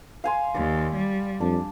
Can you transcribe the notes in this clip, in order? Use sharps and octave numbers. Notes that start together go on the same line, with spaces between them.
F5 G#5 C6
D#2 D5
G3
F2 D4